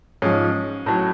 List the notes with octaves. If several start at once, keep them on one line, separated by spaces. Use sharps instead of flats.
G#2 F3 C#4
A2 F#3